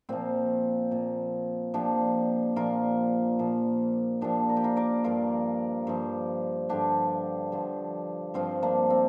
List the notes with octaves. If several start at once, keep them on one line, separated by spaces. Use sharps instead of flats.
A#2 F3 C4 F4
A#2 F3
A#2 F3 D4 G4
A#2 F3 F4 A#4
A#2 F3
A#2 F3 D4 G4
A#4
G4
F4 A#4
A#4 D5
G2 F3 F4 A#4
G2 F3
G2 D3 F3 D4 G4
G2 D3 F3
G2 F3 C4 F4
A#3 D4
C4